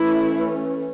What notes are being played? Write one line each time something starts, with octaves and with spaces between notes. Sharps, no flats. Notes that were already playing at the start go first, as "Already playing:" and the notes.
Already playing: E3 A3 C#4 E4